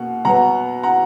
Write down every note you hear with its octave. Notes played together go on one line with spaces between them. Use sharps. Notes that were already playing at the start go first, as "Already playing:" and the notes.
Already playing: B2 A#3 F#5
B2 F#3 B3 F#5 A#5
F#5 A#5